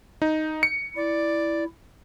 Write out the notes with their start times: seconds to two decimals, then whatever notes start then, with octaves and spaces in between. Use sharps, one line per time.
0.22 D#4
0.63 C#7
0.96 E4 D5